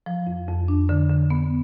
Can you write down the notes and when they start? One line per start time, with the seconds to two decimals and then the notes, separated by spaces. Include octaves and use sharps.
0.06 F3
0.27 F2
0.48 F2
0.68 D4
0.89 D3
1.09 D3
1.30 B3